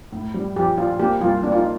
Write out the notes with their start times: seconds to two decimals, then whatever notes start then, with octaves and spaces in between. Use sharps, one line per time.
0.12 A2
0.34 G3
0.56 A#1 G4
0.78 D4 F4
1.00 A#3 G4
1.21 C2 F4
1.43 A#3 D4
1.52 F4
1.58 D#4